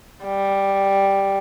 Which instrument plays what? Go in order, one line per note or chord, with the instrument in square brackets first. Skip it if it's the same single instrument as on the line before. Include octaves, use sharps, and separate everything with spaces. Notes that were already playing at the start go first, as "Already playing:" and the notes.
[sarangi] G3